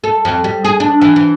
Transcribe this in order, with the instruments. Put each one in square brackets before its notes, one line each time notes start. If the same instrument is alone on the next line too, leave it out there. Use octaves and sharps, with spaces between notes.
[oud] A4
F2
G3
G#4
D4
E3
E3